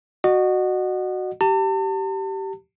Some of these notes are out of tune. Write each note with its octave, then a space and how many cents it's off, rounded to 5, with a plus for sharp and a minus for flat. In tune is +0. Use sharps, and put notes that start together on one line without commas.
F#4 +0 D#5 -35 F#5 +0
G4 -20 A5 +40